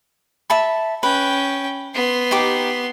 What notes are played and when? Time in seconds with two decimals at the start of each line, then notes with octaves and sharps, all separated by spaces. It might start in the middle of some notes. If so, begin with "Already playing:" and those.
0.50 E5 A5 B5
1.03 C#4 B4 G5
1.94 B3 C6
2.31 D#4 G4 D6